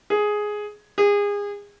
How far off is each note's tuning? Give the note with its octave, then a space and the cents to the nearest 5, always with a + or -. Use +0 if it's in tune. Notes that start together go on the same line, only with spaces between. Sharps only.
G#4 +5
G#4 -30